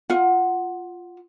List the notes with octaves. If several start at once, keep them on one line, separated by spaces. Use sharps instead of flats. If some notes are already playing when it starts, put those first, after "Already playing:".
F4 F#5